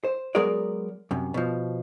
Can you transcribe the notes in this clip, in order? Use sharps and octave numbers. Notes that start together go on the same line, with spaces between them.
C5
F#3 G#3 B3 G#4 A#4 D5
F#2 C3
B2 F3